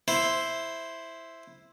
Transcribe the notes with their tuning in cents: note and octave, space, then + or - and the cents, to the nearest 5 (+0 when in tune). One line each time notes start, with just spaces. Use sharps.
E4 +0 C5 +0